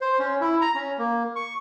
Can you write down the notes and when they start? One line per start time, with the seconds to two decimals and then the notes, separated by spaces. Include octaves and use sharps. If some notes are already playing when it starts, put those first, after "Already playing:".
0.01 C5
0.19 C#4
0.41 E4
0.61 A#5
0.75 C#4
0.98 A#3
1.36 C#6